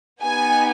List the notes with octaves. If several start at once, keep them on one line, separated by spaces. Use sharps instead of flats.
B3 D#4 G4 G#5